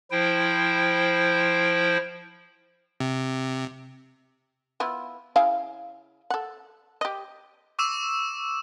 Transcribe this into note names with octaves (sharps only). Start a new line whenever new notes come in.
F3 E4 C5 G5
C3
B3 E4 F4
C#3 E4 F5
A4 F#5
G4 D#5
C#6 D6 E6 E7